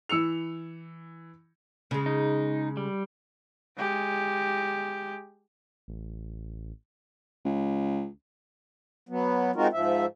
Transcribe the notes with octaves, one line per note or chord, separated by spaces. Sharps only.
E3 E6 C#7 F7
C#3 G#3
D#4
G3
G#3 G4
A1
C#2
F#3 B3
G#3 C4 D#4 F4 F#4 A#4
G#2 F3 E5